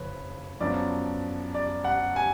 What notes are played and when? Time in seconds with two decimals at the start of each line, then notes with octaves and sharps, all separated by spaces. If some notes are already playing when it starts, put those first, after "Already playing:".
Already playing: F#1 F2 F3 B4 C#5
0.60 F#2 F3 B3 D4 D5
1.54 D5
1.84 F#5
2.16 G#5